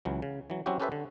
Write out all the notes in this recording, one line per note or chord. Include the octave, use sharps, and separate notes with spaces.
C#2 E3 F#3
C#3
E3 F#3
F#3 C4 C#4 E4 F#4 G4
C#4 G4 A4 B4 C5 E5
D3